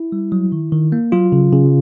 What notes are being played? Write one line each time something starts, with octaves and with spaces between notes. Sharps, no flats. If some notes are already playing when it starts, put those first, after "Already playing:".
Already playing: E4
G3
F#3
D#3
D#3
A#3
F#3 F4
C#3
C#3